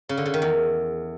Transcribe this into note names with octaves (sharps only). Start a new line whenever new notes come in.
C#3
D3
C#3
D#3
E2